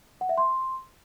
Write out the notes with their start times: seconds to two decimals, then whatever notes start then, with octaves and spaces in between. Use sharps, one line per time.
0.21 F#5
0.29 E5
0.38 C6